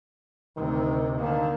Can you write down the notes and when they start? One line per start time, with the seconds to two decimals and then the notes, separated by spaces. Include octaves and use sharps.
0.56 D2 C3 D#3
1.20 D3 D#3 A#3